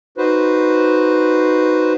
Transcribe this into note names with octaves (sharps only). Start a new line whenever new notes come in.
D#4 F#4 B4 C5